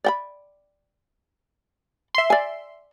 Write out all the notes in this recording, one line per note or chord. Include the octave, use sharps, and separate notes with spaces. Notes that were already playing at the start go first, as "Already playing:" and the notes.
D5 G5 B5
E5 C6
D5 G#5